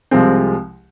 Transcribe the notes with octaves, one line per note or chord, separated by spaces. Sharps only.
C2 C3 F3 G#3 C4